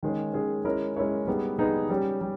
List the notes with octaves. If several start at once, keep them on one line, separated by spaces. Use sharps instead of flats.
D#3 G#3 C#4 G#4
D#3 G#3 C#4 G#4
G#3 C#4 E4 A#4 C#5
G#3 C#4 E4 A#4 C#5
G3 B3 D#4 G#4 B4
G3 B3 D#4 G#4 B4
G3 C#4 G4
G3